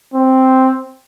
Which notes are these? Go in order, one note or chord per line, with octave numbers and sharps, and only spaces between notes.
C4